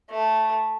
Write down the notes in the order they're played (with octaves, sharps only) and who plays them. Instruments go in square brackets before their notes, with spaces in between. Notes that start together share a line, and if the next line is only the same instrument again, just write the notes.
[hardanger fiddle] A3